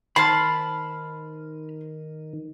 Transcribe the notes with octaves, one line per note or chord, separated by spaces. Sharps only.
D#3 C5 A5 B5 C6 F6